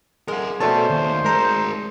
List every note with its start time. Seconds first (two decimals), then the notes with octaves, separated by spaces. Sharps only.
0.28 G#3 A#4 F#5
0.61 G3 A3 B3 C#4 F#4 C5 A5
0.90 D#2
1.25 G#3 G#4 A#4 A#5